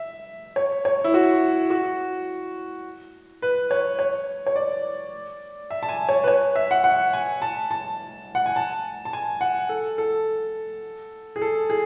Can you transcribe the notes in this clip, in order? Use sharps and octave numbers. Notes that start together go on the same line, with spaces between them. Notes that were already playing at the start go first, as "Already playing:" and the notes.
Already playing: E5
C#5
C#5
E4
F#4
F#4
B4
C#5
C#5
C#5
D5
E5
A5
G#5
C#5
B4
C#5
E5
F#5
F#5
G#5
A5
A5
F#5
G#5
A5
A5
G#5
F#5
A4
A4
G#4
A4
G#4